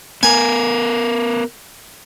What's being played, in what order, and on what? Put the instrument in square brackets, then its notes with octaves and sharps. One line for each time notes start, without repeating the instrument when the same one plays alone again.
[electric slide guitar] B3 A#4 [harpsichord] G#5